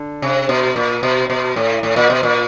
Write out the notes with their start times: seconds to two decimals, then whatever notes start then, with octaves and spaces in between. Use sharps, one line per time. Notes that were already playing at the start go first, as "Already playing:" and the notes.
Already playing: D3
0.22 C3
0.49 B2
0.76 A#2
1.03 B2
1.30 B2
1.56 A2
1.83 A2
1.96 A#2
2.10 B2
2.23 A#2